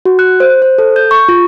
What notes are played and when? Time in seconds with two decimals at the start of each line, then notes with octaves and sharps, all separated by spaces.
0.05 F#4
0.19 F#6
0.40 C5
0.62 C5
0.78 A4
0.96 G6
1.11 C#6
1.29 F4